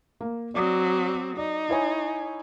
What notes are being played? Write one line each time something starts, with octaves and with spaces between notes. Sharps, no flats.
A#3
F#3 C4 D5 D6 D#6
D#4 D5
E4 C#5 G#5